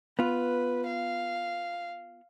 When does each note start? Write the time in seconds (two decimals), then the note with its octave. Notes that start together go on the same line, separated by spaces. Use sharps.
0.19 B3 F4 B4
0.86 F5